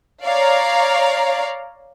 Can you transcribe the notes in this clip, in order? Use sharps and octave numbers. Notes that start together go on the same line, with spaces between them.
C#5 D5 F5 A#5